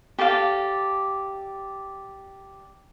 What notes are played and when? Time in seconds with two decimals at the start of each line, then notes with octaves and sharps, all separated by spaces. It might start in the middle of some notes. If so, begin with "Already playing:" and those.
0.19 G4 A4 D5 F5